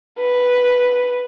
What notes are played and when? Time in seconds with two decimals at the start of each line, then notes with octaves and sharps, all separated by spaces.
0.19 B4